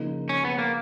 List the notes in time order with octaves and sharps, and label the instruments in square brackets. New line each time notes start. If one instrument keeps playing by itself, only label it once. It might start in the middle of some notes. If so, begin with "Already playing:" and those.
Already playing: [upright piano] C#3 F3 A#3 D#4
[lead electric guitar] C#4
B3
A#3